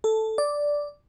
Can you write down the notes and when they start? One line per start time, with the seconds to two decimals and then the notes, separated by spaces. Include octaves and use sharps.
0.04 A4
0.38 D5